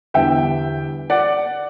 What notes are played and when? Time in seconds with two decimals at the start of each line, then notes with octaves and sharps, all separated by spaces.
0.14 E2 D3 G3 E5 G5
1.10 D5 F#5